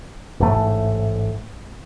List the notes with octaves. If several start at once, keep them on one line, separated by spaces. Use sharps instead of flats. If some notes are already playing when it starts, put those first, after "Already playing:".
A1 G#2 A3